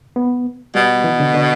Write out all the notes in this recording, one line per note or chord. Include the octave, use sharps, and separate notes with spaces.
B3
B2 G3
E3
D3
D3